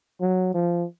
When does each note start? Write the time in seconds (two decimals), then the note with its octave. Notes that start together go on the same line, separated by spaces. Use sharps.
0.21 F#3
0.54 F3